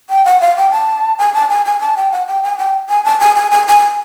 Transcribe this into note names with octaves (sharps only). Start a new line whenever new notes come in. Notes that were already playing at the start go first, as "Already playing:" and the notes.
G5
F#5
F5
G5
A5
G#5
A5
G#5
G#5
A5
G5
F#5
G5
G#5
G5
G#5
A5
G#5
G#5
G#5
G#5